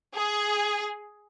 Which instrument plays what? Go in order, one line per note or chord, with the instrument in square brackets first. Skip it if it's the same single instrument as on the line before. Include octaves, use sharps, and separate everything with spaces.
[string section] G#4